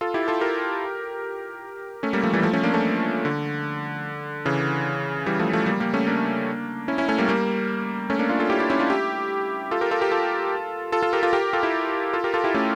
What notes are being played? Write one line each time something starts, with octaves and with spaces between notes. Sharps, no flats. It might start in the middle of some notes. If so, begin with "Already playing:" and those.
F4 A4
E4 G4
F4 A4
G4 A#4
A3 C#4
G3 A#3
F3 A3
E3 G3
F3 A3
A3 C#4
A#3 D4
A3 C#4
D3
C#3 E3
E3 G3
F3 A3
F3 A3
G3 A#3
G3 A#3
A3 C#4
A#3 D4
C#4 E4
C#4 E4
A3 C#4
G3 A#3
G3 A#3
A3 C#4
A#3 D4
D4 F4
F4 A4
E4 G4
E4 G4
C#4 E4
D4 F4
E4 G4
F4 A4
G4 A#4
F4 A4
G4 A#4
F4 A4
F4 A4
F4 A4
G4 A#4
F4 A4
G4 A#4
F4 A4
E4 G4
F4 A4
G4 A#4
F4 A4
E4 G4
A3 C#4